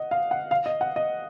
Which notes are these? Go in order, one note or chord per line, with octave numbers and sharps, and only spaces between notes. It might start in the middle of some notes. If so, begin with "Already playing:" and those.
Already playing: D#5 F#5
F5
F#5
F5
D#5
F#5
D#5